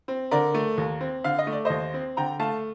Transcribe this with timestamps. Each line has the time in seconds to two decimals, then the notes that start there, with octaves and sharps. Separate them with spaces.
0.08 C4
0.31 D3 A#4 D5
0.54 A3
0.78 D#2
1.01 C4
1.24 D3 F5
1.39 D#5
1.47 A3
1.52 D5
1.65 D#2 C5 D#5
1.94 C4
2.17 D3 G5 A#5
2.40 A3 F5 A5